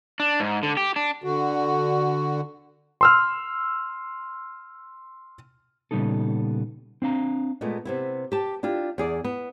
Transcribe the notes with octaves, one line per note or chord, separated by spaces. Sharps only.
D4
G#2
D3
G4
D4
D3 F#4
C6 E6 F6
A#2 C#3 G3 B3 D#4 A4
C4 D4 F5 A#5
A#2 G#3 A3 B3
C3 B3 E4
G4 A5
D4 E4 F4 G4
E2 G#4 D5
B3